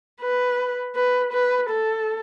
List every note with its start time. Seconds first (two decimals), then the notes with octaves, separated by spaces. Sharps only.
0.21 B4
0.96 B4
1.33 B4
1.70 A4